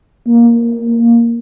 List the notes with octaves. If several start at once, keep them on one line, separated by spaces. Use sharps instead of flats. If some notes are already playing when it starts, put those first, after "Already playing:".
A#3